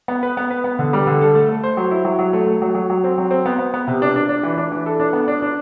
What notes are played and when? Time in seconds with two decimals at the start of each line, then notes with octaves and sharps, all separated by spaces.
0.08 B3
0.23 B4
0.37 B3
0.51 B4
0.64 B3
0.79 D3
0.93 G3
1.07 D3
1.21 A4
1.35 A3
1.49 A3
1.64 C5
1.77 F#3
1.91 E4
2.05 F#3
2.19 F#3
2.33 A3
2.47 A3
2.62 F#3
2.75 F#3
2.90 F#3
3.04 C4
3.18 F#3
3.31 C4
3.46 B3
3.59 B3
3.74 B3
3.87 C3
4.02 D4
4.16 D4
4.29 D4
4.43 E3
4.58 D4
4.72 E3
4.86 A4
5.00 D4
5.13 B3
5.28 D4
5.42 D4